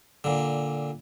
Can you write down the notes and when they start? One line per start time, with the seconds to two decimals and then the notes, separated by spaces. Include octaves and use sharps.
0.24 A#2 D3